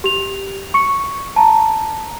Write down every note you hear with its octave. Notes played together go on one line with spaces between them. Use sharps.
G4 F7
C#6 C#7
A5 A#5